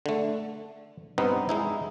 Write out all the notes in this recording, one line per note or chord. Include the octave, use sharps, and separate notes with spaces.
D3 A3
G2 B3 C4 D#4
G#3 D#4 E4